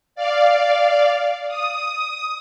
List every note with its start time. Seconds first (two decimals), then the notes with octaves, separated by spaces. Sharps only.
0.15 D5 F5
1.48 D#6